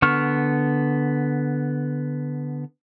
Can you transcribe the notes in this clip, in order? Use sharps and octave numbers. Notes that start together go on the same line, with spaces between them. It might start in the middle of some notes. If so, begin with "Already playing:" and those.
D3 B3 C#6 F6